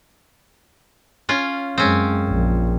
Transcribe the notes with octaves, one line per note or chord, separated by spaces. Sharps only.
C#4 F4
F#2 G#3 C4 C#4
A#1